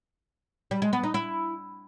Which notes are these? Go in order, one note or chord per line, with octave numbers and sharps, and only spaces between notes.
G3
G#3
B3
D#4
E4